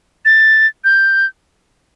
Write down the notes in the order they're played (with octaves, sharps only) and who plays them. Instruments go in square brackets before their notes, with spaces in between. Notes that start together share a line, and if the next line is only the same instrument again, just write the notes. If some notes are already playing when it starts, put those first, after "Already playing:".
[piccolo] A6
G6